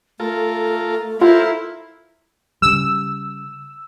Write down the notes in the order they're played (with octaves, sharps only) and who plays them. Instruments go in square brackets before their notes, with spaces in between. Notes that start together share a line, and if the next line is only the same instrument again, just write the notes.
[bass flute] A3 [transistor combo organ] F4 A4 A#4
[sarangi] E4 [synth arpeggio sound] F4 [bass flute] A4 [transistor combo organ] A#4 C5 F5
[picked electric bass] C#3 G3 [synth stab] E6